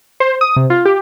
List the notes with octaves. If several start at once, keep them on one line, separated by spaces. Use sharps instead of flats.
C5
D#6
C3
F4
G4